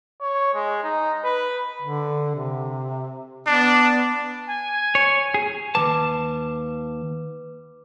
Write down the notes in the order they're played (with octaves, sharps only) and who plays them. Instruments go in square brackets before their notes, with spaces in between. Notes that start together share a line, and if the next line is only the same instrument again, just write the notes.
[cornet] C#5
G#3
D#4
B4
[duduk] D3
C3
[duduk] B3 [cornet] D4
[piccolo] G#5
[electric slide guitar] C#5
G#4
[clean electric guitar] D#2 D#3 A5 [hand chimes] B4 D6